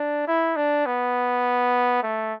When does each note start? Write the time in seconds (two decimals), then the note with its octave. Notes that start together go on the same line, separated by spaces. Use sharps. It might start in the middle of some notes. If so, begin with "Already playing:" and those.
Already playing: D4
0.27 E4
0.56 D4
0.86 B3
2.03 A3